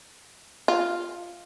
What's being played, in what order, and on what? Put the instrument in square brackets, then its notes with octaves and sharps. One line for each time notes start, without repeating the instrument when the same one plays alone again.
[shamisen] F4